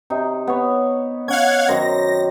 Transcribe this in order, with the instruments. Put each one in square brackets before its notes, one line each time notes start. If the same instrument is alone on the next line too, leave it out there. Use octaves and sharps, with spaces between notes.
[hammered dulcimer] C3 D#4
B3 C#5
[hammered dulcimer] C#4 [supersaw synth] F5 F#5 G#6
[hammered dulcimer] F#2 D#3 C5 [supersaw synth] A#6